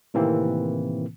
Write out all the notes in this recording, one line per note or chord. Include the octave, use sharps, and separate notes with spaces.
A2 C3 D#3 E3 A#3 C4